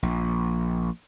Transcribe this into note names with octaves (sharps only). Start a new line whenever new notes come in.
A#1